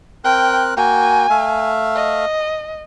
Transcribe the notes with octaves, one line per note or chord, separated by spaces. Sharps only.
C4 A#4 G5 F#6
A#3 F#4 G5 G#5
A3 E5 F5
D#5